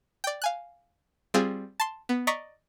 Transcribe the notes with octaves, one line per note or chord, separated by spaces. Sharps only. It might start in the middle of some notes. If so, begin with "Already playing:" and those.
D5 G5
F5 G#5 F#6
G3 C4 F4 G#4
A5 C6
B3
D5 D#5 A#5 C#6 B6